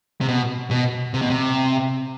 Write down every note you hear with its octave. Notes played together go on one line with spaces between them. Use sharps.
C3
B2
B2
C3
B2
C3